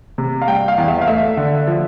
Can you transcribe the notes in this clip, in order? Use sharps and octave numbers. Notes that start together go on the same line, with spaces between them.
C3
F5
G3 G5
F5
E2
E5
F5
A3 E5
D3
F3